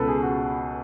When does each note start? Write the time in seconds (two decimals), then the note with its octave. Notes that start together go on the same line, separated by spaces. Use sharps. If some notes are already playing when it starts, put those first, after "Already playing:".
Already playing: C#2 B2 A4 B4
0.08 G#4
0.23 F#4